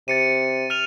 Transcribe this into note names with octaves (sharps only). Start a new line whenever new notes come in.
C3 A6 C#7 D#7
F6 D#7 F7